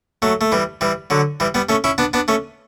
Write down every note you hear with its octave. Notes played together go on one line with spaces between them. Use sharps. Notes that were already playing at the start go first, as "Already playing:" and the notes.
F#3 A3
A3
E3 G3
E3 G3
D3 F#3
E3 G3
G3 B3
A3 C#4
C#4 E4
B3 D4
B3 D4
A3 C#4